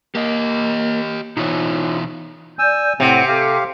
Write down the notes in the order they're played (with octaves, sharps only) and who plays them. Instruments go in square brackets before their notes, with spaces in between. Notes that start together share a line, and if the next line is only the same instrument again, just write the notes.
[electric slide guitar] A#3 [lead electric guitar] G4 D#5
[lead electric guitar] B2 E3 [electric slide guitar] D#4 F4 C#5
[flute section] D5 G6 [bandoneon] G#5 E6
[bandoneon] A2 C4 [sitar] C3 [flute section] F#5
[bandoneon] G4 F5 [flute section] A4